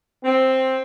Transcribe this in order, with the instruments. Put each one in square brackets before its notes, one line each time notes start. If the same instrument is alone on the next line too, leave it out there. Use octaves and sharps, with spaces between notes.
[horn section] C4